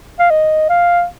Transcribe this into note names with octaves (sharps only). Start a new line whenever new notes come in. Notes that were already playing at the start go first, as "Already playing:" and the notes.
F5
D#5
F5